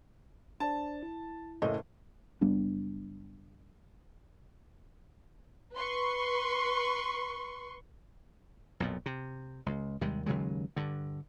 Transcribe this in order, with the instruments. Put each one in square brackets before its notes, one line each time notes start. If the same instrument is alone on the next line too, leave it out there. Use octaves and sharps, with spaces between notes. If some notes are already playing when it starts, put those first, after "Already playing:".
[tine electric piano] D4 C5 D5 [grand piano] A5
[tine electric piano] E4
[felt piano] F#1 A2 D#5
[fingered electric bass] F#1 G3 B3 D4
[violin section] B4 C6 C#6
[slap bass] B1 F2 A#2
C3
C#2
D#2 C3 G3 G#3
D#2 C#3 F#3 G#3
G2 D3